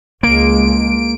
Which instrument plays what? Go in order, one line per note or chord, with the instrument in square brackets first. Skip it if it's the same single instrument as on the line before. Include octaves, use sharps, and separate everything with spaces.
[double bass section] C#2 G#3 [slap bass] A#3 [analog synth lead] D7